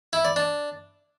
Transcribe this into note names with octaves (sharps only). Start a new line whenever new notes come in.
E4
D5
D4